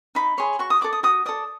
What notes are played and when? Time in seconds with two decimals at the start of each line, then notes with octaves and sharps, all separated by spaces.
0.15 D#4 B5
0.38 G#4 C#5 C6
0.59 F#4 C#6
0.70 D#6
0.81 A4 D5 D6
0.93 D#6
1.03 F#4 D#6
1.26 A4 D5 D#6